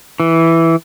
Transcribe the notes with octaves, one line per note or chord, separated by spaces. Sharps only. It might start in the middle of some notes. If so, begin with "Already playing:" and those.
E3